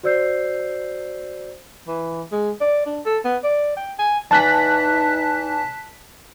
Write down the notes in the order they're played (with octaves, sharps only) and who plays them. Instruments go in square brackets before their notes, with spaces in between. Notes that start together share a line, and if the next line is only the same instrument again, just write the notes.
[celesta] F#4 C5 D5 E6 G6 C7
[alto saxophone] E3
G#3
D5
D4
A4
B3
D5
G5
G#5
[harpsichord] E2 E3 A#5 [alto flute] D#4 [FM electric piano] A5 F#6 B6